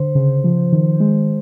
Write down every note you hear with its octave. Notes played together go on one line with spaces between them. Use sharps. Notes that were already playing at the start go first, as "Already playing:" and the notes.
Already playing: D3 C5
C#3
F3
D#3
G#3